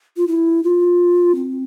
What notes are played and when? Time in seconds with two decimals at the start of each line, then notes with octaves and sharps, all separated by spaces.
0.17 F4
0.28 E4
0.64 F4
1.35 C4